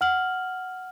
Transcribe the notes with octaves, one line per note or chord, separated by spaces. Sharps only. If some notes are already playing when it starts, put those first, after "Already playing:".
F#5 F6 F#7